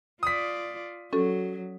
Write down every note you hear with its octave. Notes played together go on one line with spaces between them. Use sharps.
F4 D5 D#6 B6
F#3 C#4 F#4 A4